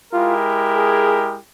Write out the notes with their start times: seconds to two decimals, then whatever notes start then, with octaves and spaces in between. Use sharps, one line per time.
0.13 G#3 E4 F4 G4 A#4
0.75 G#4